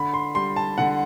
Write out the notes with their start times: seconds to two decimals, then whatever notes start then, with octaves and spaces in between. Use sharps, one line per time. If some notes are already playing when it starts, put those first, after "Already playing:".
Already playing: D3 B5
0.14 C6
0.35 G3 C6
0.56 A5
0.78 D3 F#5